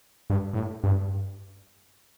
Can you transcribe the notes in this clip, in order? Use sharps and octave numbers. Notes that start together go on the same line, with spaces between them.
G2
A2
G2